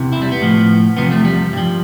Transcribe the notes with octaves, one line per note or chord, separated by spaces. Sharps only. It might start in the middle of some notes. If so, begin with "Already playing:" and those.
Already playing: E2 C3 E3
E4
G3
B3
A2 F3
E2 C3 F3 B3
A3
G3
G2 F3